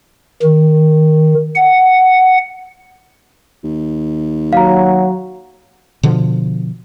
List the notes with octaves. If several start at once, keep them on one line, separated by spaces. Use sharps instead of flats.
D#3
F#5
D#2
F#3 F5 A#5
B2 D3 F3